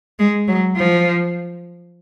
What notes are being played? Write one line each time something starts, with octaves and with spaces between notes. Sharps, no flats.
G#3
F#3
F3